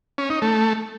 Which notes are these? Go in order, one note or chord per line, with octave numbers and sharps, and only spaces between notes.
C#4
D#4
A3